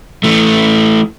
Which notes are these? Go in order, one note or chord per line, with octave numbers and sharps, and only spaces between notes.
E3 A3